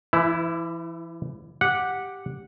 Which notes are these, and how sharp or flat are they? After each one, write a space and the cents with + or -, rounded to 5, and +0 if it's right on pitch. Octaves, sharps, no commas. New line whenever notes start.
E3 +35 E4 +0
G4 +0 F#5 -10